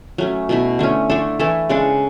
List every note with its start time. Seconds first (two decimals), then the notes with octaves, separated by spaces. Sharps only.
0.18 F#3 A3 C#4
0.49 B2 A3 E4
0.79 D3 A3 C#4
1.10 D3 A3 D4 A4
1.39 E3 A3 E4 A4
1.69 C#3 G#3 D4 A4